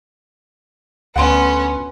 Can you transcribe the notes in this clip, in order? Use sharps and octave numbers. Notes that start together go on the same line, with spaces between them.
D2 B3 C#4 F#5 C6